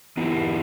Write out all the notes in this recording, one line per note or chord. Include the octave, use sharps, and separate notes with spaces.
E3 B3 E4 G4